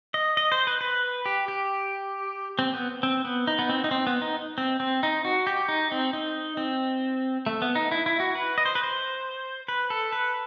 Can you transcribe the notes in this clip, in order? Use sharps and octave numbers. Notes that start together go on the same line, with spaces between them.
D#5
D#5
C5
B4
B4
G4
G4
C4
B3
C4
B3
D#4
B3
C4
D#4
C4
B3
D#4
C4
C4
D#4
F#4
G4
D#4
C4
D#4
C4
A3
B3
D#4
E4
E4
F#4
B4
D#5
C5
B4
C5
B4
A4
B4